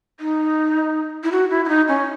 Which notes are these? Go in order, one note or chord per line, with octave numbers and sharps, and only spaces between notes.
D#4
E4
F#4
E4
E4
D#4
C#4